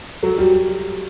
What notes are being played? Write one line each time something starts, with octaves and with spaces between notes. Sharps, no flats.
F#3 A4
G3 F#4